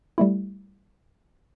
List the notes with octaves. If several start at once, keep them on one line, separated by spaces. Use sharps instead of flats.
G3 A3 E4